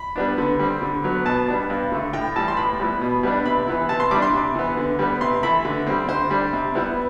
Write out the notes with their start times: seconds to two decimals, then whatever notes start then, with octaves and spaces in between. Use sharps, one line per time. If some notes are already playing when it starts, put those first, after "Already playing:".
Already playing: B5
0.16 G3 B3 D4
0.38 D3
0.59 G3 C4
0.82 D3
1.04 F#3 B3
1.26 B2 A5
1.48 G3 B3 D4
1.70 G2
1.91 D3 A3
2.13 A2 G5
2.36 E3 G3 A5
2.48 C6
2.57 A2 B5
2.79 G3 B3 E4
3.01 B2
3.23 G3 B3 D4
3.45 C3 B5
3.67 E3 B3 E4
3.89 C3 A5
4.00 C6
4.11 G3 D4 D6
4.22 C6
4.33 C3
4.55 E3 B3
4.77 D3
4.99 G3 B3
5.21 C3 C6
5.43 E3 A3 E4 B5
5.65 D3
5.87 G3 C4
6.08 D3 C5
6.30 G3 D4
6.53 C3
6.75 G3 B3 E4